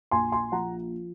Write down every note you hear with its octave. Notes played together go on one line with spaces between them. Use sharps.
A#1 G#5 C6
G#5 C6
F3 F#5 A#5